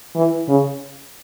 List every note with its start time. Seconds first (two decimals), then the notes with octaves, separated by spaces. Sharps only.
0.15 E3
0.48 C#3